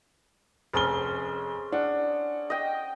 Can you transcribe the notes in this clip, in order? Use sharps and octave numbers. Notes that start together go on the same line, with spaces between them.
F1 C#4 G#4 C5 G7
D4 F#5
D#5 G5